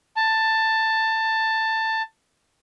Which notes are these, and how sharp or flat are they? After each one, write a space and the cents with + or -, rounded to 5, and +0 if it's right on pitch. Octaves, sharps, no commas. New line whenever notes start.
A5 +10